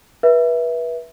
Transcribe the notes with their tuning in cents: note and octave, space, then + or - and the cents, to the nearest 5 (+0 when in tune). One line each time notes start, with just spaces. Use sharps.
B4 -30 E5 +0